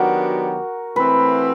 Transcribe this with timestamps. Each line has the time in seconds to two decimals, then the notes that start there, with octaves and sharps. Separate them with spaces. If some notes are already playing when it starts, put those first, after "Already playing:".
Already playing: D#3 F#3 B3 D4 F#4 G4 A#4
0.96 E3 A3 C4 B4